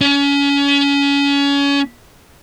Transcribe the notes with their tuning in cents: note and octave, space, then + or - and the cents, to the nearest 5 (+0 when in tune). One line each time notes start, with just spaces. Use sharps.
C#4 +30